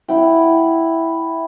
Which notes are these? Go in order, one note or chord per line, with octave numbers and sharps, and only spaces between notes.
E4 F#5 G5